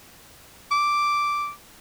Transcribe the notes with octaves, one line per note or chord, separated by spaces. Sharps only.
D6